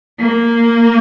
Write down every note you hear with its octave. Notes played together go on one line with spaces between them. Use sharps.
A#3